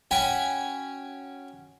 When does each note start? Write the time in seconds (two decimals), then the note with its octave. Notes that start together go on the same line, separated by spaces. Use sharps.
0.11 C#4 F#4 G5 G#5 B5